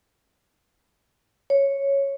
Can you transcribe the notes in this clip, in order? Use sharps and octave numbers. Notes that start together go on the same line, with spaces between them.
C#5